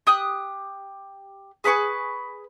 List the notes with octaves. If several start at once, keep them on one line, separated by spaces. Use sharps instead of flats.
G4 D#6 F#6
G#4 B4 B5 C#6